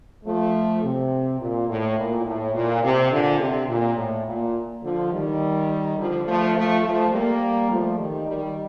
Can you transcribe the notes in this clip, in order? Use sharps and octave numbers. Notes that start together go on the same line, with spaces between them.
F3 A3
C3
A#2
A2
A#2
A2
A#2
C3
A#2 D3
C3
A#2
A2
A#2
D3 F3
D#3 G3
D3 F3
F3 A3
F3 A3
F3 A3
G3 A#3
F3 A3
D#3 G3
D#3 G3